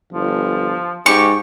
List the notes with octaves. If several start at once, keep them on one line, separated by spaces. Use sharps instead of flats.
G1 F3
G#2 G4 C#6